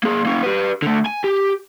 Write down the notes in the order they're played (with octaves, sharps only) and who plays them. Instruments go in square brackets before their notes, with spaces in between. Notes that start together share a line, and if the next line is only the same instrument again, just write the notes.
[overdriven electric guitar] A#3 G#4
A#3 C#4
G4 B4
D3 A3
G#5
G4